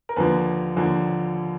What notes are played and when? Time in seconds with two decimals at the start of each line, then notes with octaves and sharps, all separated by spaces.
0.09 A#4
0.16 D#2 D3 F3 A#3 B4
0.76 D#2 D3 F3 A#3